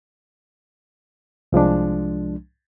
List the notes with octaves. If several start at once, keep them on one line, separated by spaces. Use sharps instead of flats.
C2 F3 G#3 D4